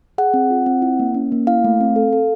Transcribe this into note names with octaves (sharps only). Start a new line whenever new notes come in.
G#4 F#5
C4
F4
C4
E4
A#3
C#4
A#3
E4 F5
A3
C4
A4
A4